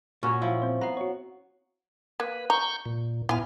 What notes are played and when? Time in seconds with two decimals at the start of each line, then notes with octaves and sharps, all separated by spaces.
0.23 A#2 C#4 F#4 C#5
0.42 F3 E4
0.62 C4 C5
0.81 B3 A#5 C7
0.97 F#4 C#5
2.20 A#3 B4
2.50 A#5 C#6 G6
2.86 A#2
3.29 A#2 B3 E4 G#5 F6